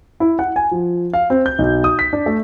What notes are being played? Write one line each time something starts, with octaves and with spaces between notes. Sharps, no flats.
E4
F#5
G#5
F3
F5
C4
G6
B1
D#6
B6
D4
A3